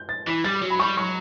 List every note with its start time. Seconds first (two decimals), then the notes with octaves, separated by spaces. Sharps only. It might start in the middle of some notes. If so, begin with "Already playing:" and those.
Already playing: G6
0.09 A6
0.27 E3 B6
0.44 G3 A6
0.62 F#3
0.70 B5
0.80 G3 C#6
0.97 F#3 C#6